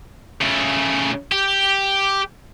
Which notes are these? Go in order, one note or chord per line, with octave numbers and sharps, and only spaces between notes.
C#3 A3
G4